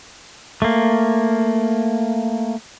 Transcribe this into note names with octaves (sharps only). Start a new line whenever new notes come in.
A3 A#3